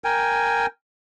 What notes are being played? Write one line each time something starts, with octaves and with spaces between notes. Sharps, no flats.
A#4 G5 G#5